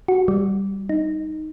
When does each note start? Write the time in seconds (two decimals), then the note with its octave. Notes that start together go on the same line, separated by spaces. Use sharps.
0.08 F#4
0.28 G3
0.89 D#4